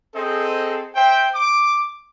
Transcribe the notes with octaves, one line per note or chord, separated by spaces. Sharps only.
C4 G#4 A4 C5 D#5
C5 E5 G5
D6